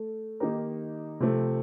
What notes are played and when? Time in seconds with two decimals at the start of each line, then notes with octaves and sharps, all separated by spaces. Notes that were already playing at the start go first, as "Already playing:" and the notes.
Already playing: A3 A4
0.40 D#3 A#3 D#4 G4 A#4
1.20 C3 F3 A3 C4